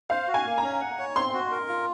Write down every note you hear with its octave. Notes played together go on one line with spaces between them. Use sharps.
C5 F5
F#4
G#5
A#3
A#5
C#4
F#5
C#5
C4 C6
F#4
A#4
F4